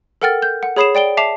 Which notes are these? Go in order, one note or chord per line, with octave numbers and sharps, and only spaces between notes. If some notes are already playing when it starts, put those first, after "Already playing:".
A4 A#4 F#5 G5 F6 A6
G6
F#5
G#4 C#5 B5 D#6 C7 E7
D5 G5 D7 G7
E5 A5 D6 C7 F7